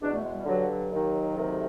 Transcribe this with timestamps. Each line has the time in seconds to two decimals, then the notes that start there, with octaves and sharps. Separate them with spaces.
0.01 E2 B2 D4
0.12 A3
0.24 G#3
0.34 G3
0.46 G2 D3 F#3
0.68 F#3
0.91 D#2 D#3
1.35 D2 C3 D#3